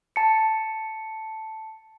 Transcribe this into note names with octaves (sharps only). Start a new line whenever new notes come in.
A5 C#7